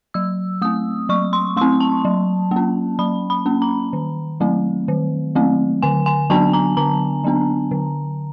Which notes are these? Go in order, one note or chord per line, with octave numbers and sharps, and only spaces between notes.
F#3 E6
A3 C4 D#6
F#3 C#6
C6
A3 C4 C6
A5
F#3
A#3 C#4
F#3 B5
B5
A#3 C#4
A#5
D#3
F#3 A3 C4
D#3
F#3 A3 C4
D3 G#5
G#5
F#3 B3 D4 A5
A#5
D3 A#5
F#3 B3 D4
D3